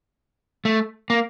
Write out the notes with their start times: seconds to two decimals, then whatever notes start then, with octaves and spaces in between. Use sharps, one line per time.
0.65 A3
1.10 A#3